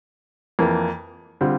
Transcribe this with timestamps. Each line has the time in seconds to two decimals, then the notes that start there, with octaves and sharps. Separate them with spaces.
0.59 F2 E3 A#3
1.41 D3 G3 C4 F4